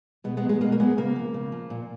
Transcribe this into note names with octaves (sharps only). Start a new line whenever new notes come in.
B2 G#3 B3
G#3 B3
F#3
G#3
B2 A#3
A#3
F#3 G#3 B3
C#3 A#3
F3
C#3
F3
A#2